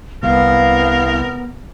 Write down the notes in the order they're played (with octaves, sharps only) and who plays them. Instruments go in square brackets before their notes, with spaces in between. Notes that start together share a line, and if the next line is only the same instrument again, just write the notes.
[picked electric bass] C2 [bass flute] B3 [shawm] A#4 [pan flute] F5